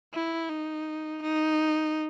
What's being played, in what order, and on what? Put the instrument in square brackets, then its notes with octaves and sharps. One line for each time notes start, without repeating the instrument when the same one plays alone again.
[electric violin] E4
D#4
D#4